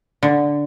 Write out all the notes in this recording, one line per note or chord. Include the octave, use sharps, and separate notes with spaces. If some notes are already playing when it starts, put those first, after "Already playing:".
D3